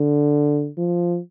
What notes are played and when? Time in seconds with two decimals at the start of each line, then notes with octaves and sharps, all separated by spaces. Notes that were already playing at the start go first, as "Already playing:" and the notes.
Already playing: D3
0.78 F3